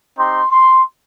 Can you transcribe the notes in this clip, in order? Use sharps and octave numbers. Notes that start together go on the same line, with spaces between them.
C4 D#4 G4 C6
C6